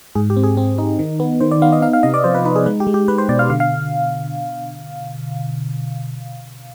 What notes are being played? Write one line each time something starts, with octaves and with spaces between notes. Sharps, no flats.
G#2 G#4
G4
C4
G#4
C4
D#4
D#3
B3
D#3 C5
D5
B3 F5
D#5
D#4 F5
F5
C3 D#5
D5
F3 C5
B4
D#4 B4
G#4
G#3 B4
G4
G#3
G4
G#3 B4
C5
B2 D5
F5
D3 F5
F5